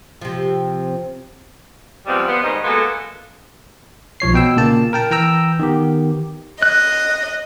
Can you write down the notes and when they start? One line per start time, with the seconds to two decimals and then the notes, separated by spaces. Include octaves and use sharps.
0.21 C3 F3
2.07 C3 F3 G3 G#3 B3 C4
2.28 B3 C5
2.43 D#3 G3 G#3 D#4
2.64 G#3 A#3 B3 F#4 A4
4.20 B1 F3 C#5 C7
4.34 B2 G5 E6
4.57 A#2 C#3 A#3 A5
4.93 A#4 G5 A5
5.11 E3 G5 A#5 E6
5.59 D#3 B3 G4
6.62 D#5 F#6